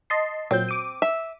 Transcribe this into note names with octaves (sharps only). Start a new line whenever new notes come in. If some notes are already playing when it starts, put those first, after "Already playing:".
D#5 A5 C6
A#2 F#3 C4 G6
D6 D#7
E5